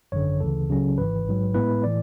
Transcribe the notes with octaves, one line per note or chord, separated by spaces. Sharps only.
G#1 F#2 D3 C#5
D2 C#3 E3 A4
C#2 C#3 F#3 C#4
G#1 G#2 E3 B4
A1 G#2 F#3
A2 G#3 B3 E4 B4
A2 E3 D5